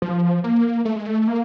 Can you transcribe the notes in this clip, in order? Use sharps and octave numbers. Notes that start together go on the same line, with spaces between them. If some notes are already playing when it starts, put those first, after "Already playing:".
F3
A#3
A3
G#3
A3
A#3